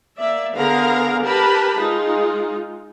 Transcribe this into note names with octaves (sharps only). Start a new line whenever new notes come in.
A#3 D5 E5
D3 B3 G#4 A#4 F5 A#5
G4 A#4 B4 A5 B5
G#3 D#4 F4